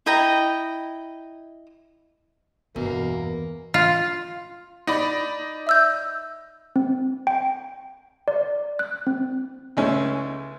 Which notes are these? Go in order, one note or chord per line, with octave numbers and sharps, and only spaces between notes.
E4 D#5 G5 A#5
G1 E2 B2 A#3
F4
D#4 D5 B5
E5 E6 G6
C4
G5
D5
F#6
C4
C#2 G#3 A3 C#4